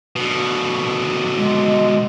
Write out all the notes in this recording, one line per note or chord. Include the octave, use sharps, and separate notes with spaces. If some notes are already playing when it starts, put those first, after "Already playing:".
B2 D3
G#3